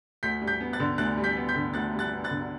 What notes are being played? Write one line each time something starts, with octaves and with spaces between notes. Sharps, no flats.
D2 G6 B6
G3
G6 B6
B3
F#6 A6
D3
D2 F#6 A6
G3
G6 B6
B3
G6 B6
D3
D2 F#6 A6
G3
F#6 A6
B3
F#6 A6
D3